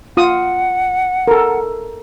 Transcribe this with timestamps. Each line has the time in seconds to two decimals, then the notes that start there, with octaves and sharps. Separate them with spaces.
0.17 F4 F#5 D#6
1.28 A4 A#4